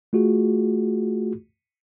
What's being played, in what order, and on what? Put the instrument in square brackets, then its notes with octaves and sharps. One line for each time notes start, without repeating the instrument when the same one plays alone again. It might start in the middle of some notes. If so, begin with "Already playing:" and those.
[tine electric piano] A3 F4 F#4 G#4